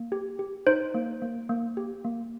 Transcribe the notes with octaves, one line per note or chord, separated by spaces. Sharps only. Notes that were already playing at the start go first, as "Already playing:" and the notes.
Already playing: A#3
G4
G4
D#4 C5
A#3
A#3
A#3
G4
A#3